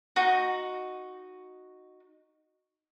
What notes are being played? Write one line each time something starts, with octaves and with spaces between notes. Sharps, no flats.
D#4 F#4